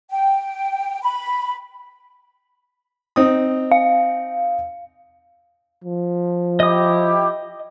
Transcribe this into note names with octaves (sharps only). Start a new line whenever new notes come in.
G5
B5
C4 D#4 D#6
F5
F3
E4 G4 D#5 D#6